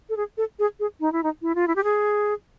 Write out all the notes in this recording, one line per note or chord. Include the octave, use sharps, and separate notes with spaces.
A4
G#4
A4
G#4
G#4
D#4
E4
D#4
E4
F4
E4
G4
G#4